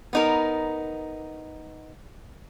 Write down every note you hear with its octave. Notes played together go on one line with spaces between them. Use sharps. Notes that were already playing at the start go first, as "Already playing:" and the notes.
B3 D#4 A#4